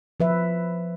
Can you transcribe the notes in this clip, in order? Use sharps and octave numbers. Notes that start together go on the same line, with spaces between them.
F3 B4 E5